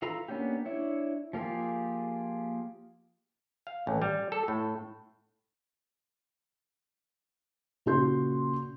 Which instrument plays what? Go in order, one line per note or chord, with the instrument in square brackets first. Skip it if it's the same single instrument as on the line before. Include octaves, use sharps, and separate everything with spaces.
[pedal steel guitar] E3 F4 A4 A#5 B5
A#3 B3 C#4 D4 G4
D4 E4 C#5
F3 A#3 F4 G4 G#4
[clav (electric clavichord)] F5
A1
G3
A4
A2
[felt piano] A#2 C#3 F#4 C6 G6